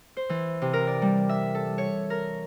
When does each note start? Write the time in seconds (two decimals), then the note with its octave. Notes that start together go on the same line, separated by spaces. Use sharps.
0.17 C5
0.29 E3
0.62 C3
0.73 A#4
0.87 D5
1.02 G3
1.29 E5
1.55 A4
1.78 C#5
2.10 A#4